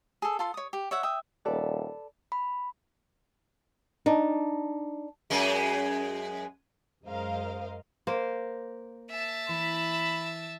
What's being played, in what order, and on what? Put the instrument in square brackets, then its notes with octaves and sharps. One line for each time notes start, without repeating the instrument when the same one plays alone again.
[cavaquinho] G#4 A4
F4 A4 C6
C#5 D#6
G4
C#5 E5 F#5
E5 G5 D#6
[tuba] D#1 [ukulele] A4 B4 D5
[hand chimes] B5
[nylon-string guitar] D4 D#4
[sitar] F#2 G#3
[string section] F#2 G#3 A#4 C5 D#5 F5
[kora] A#3 C5
[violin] E5 A5
[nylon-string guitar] E3 [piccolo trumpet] B5